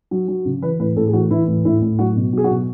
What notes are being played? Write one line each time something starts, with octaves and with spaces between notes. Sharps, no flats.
F#3
F#3
C#3
E3 B4
A2 B4
A2 A4
G#4
E3 F#4
E3 E4
A2
A2 E4
A2
F#3 F#4
B2
F#3 G#4
F#4
B2